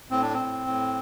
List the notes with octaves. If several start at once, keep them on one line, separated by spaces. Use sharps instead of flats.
A2 C4
D4
C4
A2
A2